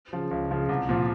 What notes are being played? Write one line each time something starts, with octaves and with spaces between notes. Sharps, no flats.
C#3 F3
C#2
C#3 F3
C2
A#2 F3